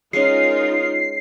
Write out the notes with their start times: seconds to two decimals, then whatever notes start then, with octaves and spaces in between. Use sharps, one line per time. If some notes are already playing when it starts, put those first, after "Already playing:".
0.13 G#3 C#4 D#4 F4 A#4 C7